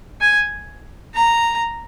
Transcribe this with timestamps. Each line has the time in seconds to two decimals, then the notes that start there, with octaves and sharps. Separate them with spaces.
0.21 G#5
1.15 A#5